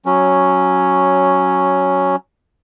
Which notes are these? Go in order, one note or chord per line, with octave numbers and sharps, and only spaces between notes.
F#3 C#4